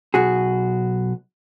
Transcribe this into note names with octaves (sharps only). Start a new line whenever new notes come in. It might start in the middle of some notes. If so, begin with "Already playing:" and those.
B1 F#4 G#4